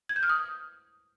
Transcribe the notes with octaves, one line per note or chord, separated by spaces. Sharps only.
G#6
G6
F6
D#6